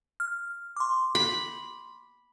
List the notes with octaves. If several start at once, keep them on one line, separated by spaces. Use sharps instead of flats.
F6
C6 D6
B5